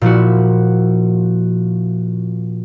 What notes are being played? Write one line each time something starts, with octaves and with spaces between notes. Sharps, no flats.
A#2 F3 E4 F#4